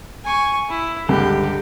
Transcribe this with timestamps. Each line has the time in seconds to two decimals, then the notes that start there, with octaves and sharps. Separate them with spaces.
0.25 G#5 C#6
0.70 E4
1.08 C#2 G2 D3 G4